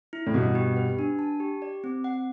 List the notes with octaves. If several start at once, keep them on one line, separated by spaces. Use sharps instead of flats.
E4
A2
G2 B2 F#5
G4
B4
D4
A5
G4
D5
C4
F#5